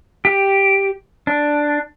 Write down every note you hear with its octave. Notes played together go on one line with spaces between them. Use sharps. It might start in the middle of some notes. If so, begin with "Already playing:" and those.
G4
D4